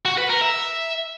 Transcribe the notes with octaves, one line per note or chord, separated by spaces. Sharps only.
F#4
B4
A#4
E5